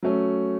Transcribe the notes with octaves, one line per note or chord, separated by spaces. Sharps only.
F#3 A3 C#4